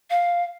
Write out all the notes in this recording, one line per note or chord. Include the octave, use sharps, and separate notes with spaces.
F5